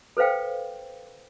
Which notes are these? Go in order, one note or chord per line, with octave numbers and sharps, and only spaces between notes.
A4 B4 C5 F5 G5